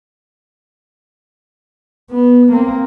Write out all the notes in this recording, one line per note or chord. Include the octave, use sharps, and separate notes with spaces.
B3
A#3 C4